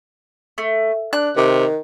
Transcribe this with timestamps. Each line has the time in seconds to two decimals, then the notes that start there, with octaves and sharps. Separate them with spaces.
0.58 A3
1.13 D4 F#6
1.36 C3 D#3